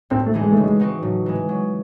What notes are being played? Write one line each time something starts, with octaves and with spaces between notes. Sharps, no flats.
A2 C4
A3
E3 C4 D#4 G#4
G#3
A3
C#3
G#3
E3 C4 D#4 F#4
A2 F#3
E3 G#3
F#3